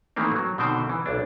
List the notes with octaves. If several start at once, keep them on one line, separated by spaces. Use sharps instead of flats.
D#3 E3 A3 A#3 C4
F#3
B2 D3 D#3 C4 C5 G5
E3
B1 D4